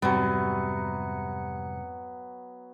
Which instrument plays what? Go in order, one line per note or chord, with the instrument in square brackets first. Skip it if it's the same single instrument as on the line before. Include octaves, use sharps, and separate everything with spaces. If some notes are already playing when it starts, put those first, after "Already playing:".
[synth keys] F2 G#2 C#7 [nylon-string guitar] C3 G3 [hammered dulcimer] F#3 B3